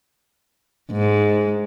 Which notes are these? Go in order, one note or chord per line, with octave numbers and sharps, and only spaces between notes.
G#2